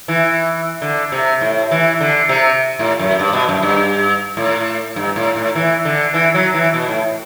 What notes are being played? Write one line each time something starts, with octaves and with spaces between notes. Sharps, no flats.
E3
D3
C3
A2
E3
D3
C3
A2
F#2
G2
B2
F#2
G2
A2
G2
A2
A2
E3
D3
E3
F#3
E3
B2
A2